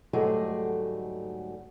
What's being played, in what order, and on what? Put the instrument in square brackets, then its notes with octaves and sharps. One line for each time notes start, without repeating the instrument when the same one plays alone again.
[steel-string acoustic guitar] D2 G#2 F#3 G3 A3 G#4